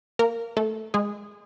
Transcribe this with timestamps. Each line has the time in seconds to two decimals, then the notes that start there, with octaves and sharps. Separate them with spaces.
0.19 A#3 A#4
0.57 A3 A4
0.94 G#3 G#4